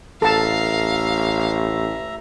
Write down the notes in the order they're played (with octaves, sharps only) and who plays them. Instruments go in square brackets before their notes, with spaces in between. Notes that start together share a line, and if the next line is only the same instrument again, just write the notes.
[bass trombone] A1 [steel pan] A4 A5 [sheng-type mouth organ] E5 A#5 [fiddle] F5